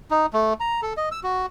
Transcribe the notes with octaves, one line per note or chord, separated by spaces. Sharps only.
D#4
A3
A#5
A4
D#5
E6
F#4